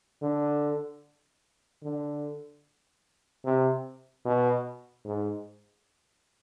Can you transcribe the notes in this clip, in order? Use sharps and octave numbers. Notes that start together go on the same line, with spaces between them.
D3
D3
C3
B2
G#2